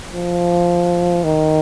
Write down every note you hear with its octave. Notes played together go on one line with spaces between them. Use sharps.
F3
D#3